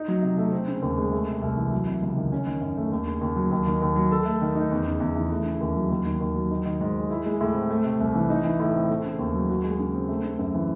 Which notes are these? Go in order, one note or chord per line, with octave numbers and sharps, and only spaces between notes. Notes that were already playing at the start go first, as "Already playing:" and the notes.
Already playing: D#4
F#3
C3
A3
C4
C#3
D#2
G#3
A3
C3
C2
E3
F#3
C3
C#2
D#3
C#4
D#3
F#2
A3
D#2
C#3
D#2
F#3
D#2
D#3
D#2
F#3
A4
A3
D#3
D#4
E2
C#3
E2
E3
A3
C#3
D#2
F#3
D#2
D#3
D#2
F#3
D#4
D#3
G#2
G#3
E4
G#3
A2
C4
A3
C3
C2
E3
D#4
E3
A2
C4
A3
C#3
D#2
F#3
F#4
G#3
C#3
C4
A3
C#3
F#2
E3